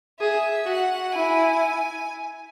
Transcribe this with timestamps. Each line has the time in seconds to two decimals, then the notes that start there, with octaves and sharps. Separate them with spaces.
0.20 G#4 E5
0.66 F#4 F#5
1.12 E4 G#5